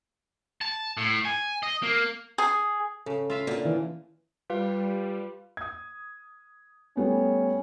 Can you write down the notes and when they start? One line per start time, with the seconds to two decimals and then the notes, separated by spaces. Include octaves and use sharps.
0.61 A5
0.97 A2
1.25 G#5
1.63 D#5
1.83 A#3
2.38 G#4
3.06 C#3 A4
3.30 F4 E5 F5
3.47 A#2 D3
3.65 D#3 E3
4.50 G3 F4 B4 F5
5.57 D#6 G#6
6.97 G3 A3 B3 C#4